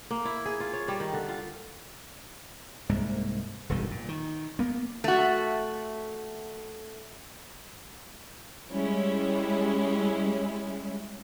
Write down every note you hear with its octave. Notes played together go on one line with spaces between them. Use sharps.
A#3
E4
G#4
F4
C#5
G3
D#3
D3
F4
C2 G#2 A#3
E1 B1 G2 D#3
A#2
D#3
A#3 B3
A3 F#4
G3 G#3 C#4 E4